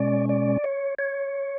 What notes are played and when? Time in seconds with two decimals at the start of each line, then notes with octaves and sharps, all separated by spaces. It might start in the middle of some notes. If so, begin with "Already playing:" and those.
Already playing: B2 G#3 C#4 D5
0.29 D5
0.64 C#5
0.99 C#5